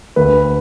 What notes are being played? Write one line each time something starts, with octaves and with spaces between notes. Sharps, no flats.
D2 B4